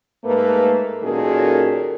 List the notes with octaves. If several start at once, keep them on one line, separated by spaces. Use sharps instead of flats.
G#2 A3 A#3 A4 B4
A#2 D#3 F#3 C#4 G#4 A4